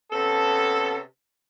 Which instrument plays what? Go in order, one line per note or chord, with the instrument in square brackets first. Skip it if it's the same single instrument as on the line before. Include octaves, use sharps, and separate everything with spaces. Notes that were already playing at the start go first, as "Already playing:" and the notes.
[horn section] C3 B3 C#4 A4